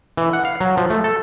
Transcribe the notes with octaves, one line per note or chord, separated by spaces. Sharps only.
E3
F#5
F5
F#3
F3
A3
A4